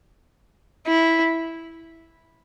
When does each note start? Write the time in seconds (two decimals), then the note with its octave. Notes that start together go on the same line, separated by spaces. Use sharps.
0.87 E4